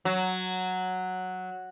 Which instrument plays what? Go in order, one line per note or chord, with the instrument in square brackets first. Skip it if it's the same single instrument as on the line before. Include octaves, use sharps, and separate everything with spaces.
[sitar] F#3